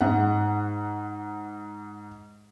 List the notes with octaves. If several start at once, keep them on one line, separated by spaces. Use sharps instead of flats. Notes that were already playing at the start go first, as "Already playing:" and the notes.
G#2 F#5